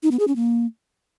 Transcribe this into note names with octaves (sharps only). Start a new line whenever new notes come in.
D#4
B3
G#4
C#4
A#3